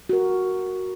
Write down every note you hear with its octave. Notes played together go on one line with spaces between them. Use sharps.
F#4 A#4